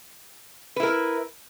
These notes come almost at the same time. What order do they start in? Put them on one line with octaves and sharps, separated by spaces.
B4 E4 A#4